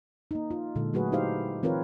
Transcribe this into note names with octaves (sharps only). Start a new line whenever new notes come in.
A#3 D#4
F4
A#2 D3 G#3 A4
F#3 A3 F#4 G#4 B4
D#4 E4 G4 C5 F5
E3 C4 F4 A#4 B4 C#5